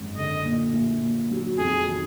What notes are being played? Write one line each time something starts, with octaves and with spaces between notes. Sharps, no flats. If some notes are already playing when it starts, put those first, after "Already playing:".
Already playing: G#1 F#2 G#3
D3 D#5
A#2
A#1
A#2
F#3
F2 G#4
D#3